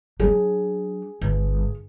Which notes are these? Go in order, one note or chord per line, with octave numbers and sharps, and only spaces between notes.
F#3 D4 G#4
G1